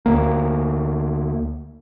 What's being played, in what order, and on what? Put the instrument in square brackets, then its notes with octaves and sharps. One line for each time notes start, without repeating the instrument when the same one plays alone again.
[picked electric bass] D2 A#3